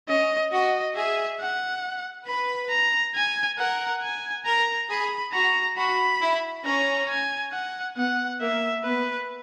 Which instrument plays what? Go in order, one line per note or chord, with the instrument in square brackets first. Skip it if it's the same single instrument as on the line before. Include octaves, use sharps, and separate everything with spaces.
[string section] C#4 [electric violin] D#5
[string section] F#4 [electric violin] D#5
[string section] G#4 [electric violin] E5
[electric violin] F#5
[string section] B4 [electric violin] B5
[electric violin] A#5
G#5
[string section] A#4 [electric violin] F#5
[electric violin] G#5
[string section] A#4 [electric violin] A#5
[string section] G#4 [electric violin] B5
[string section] F#4 [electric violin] A#5
[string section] F#4 [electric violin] B5
[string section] E4
[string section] C#4 [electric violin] A#5
[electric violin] G#5
F#5
[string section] B3 [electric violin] F#5
[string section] A#3 [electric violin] E5
[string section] B3 [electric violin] B4